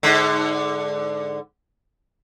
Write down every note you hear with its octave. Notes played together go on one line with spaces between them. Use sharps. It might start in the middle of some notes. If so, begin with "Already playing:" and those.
G#2 D3